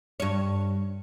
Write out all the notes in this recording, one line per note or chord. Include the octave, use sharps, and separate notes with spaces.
G2 C#5